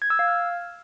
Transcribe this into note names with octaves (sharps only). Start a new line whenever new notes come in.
G#6
E6
F5
F6